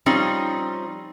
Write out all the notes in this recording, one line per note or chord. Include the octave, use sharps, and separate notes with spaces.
F3 G3 C4 C#4 D#4